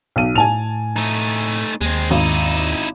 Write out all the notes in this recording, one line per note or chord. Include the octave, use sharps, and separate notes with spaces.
B1 D#7
A2 G#5 A5 F7
A3 D#4
D#2 G#3 C4
G#1 D#4 E4